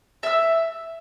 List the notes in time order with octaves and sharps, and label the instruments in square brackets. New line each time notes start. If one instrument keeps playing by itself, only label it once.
[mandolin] E5 E6